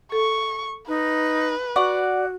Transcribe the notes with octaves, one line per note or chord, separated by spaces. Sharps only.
A4 C#6
D#4 B4
F#4 D5 F#5 C#6